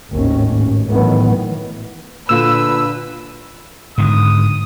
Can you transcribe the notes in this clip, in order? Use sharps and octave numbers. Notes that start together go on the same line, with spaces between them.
G#1 D#2 A2 C#4
A2 D#3 E3 F#3 A3 B3
A#2 D3 F4 B4 E6
G#2 D3 D#3 D#6